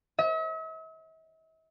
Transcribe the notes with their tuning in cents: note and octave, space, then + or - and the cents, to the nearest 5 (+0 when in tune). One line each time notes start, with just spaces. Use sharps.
E5 -45